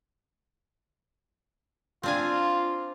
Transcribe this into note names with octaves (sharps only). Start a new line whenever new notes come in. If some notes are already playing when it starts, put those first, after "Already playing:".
C4 D4 F4 G#5